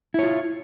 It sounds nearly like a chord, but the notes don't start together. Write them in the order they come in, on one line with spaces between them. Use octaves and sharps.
E4 C#5 F4